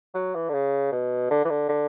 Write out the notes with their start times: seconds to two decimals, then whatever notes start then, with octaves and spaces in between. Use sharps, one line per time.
0.15 F#3
0.35 E3
0.49 D3
0.54 C#3
0.92 B2
1.31 D3
1.45 E3
1.50 D3
1.69 D3